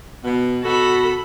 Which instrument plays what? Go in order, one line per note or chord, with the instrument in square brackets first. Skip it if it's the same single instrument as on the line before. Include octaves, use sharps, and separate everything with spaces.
[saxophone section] B2 B3
[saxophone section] B2 F#4 [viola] A4 B5